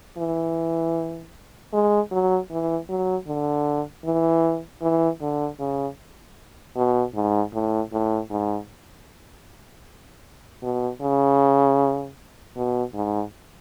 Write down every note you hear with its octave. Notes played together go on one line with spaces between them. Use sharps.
E3
G#3
F#3
E3
F#3
D3
E3
E3
D3
C#3
B2
G#2
A2
A2
G#2
B2
C#3
B2
G#2